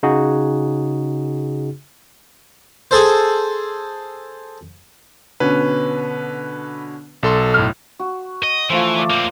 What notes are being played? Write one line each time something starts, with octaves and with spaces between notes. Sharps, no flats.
C#3 D#4 F#4 G#4
G#4 A4 C5
B2 D3 C#4 B4
B1 A4 C6
A2 F6
F#4
D#5
E3 F3 A3 C5
D5 A#5
A#3 C4